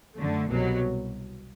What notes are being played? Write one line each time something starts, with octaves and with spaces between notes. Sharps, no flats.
F#2 D3 A3
C2 B2 F#3